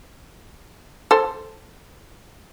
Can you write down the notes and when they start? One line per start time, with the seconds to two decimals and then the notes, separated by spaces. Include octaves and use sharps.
1.11 A4 C5